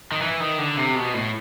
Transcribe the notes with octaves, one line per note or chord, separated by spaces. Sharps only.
D#3
E3
D#3
D3
C3
B2
A2